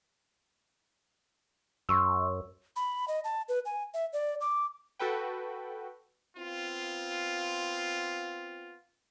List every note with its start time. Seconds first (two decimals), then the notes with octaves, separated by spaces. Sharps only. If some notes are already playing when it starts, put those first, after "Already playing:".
1.89 F#2 C6 C#6 E6
2.76 B5
3.08 D#5
3.24 A5
3.49 B4
3.65 G#5
3.94 E5
4.13 D5
4.41 D6
4.99 F#4 A4 B4 G5
6.37 B3 C4 F4